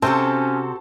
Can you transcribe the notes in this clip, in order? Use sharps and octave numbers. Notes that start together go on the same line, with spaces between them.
C3 C4 C#4 F#4 A4 A5 C6 G6